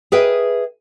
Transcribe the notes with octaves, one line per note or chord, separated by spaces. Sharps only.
G#4 A#4 B4 D#5 E5 G5